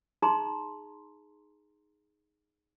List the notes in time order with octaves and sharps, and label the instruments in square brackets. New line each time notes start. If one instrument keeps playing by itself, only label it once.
[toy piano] D#4 G#4 A#5 C6